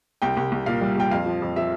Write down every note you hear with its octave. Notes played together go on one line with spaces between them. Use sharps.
C2 G5
C2
C2
A#2 F5
G3
A#2 G5
F2 F5
F3
F2
F3 E5